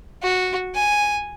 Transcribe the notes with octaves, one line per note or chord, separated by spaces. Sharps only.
F#4
G#5